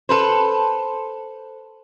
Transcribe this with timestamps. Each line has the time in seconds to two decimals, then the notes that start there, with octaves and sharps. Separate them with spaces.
0.09 A4 B4 C5